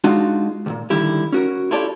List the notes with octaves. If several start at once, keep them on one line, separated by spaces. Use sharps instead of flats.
G#3 D4 D#4 F4 F#4 F#5
C#2 A#2
D3 D#3 G3 E4 G4
C#4 F#4 A#4
E4 F4 G4 A4 C#5 D5